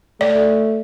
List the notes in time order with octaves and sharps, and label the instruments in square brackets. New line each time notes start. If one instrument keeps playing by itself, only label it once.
[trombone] A3 [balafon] D5